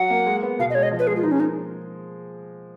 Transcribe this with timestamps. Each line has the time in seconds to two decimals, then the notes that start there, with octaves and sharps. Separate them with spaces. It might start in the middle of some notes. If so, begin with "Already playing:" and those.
Already playing: F#3 F#5
0.10 A#3
0.26 G#3
0.43 B3
0.59 B2 F5
0.70 D#5
0.75 G#3 C#5
0.83 D#5
0.91 F3
0.99 B4
1.07 G#3 G#4
1.16 F4
1.23 F3 D#4
1.31 C#4
1.40 A#3 D#4